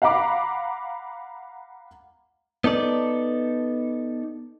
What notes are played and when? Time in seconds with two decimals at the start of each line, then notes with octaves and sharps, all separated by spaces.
0.02 F5 F#5 A#5 B5 D6
2.64 B3 D#4 A4 D5